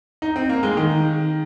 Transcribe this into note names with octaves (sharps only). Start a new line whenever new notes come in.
D#4
C4
A#3
G#3
D#3